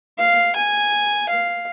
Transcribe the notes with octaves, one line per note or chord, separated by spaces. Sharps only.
F5
G#5
F5